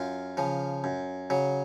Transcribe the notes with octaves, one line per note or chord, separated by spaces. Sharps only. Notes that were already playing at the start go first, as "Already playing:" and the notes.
Already playing: F#2 F4
C#3 F3
F#2
C#3 F#3